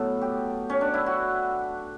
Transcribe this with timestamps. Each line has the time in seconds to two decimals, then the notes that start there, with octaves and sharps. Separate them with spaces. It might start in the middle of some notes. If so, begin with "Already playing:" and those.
Already playing: A2 F#3 B3 A4
0.21 G4
0.70 C#4
0.81 D4
0.94 E4
1.06 F#4